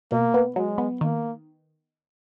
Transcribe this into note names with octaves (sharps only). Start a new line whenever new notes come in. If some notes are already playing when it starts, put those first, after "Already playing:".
B2 A#3
B3
F#3 G#3
B3
D#3 A#3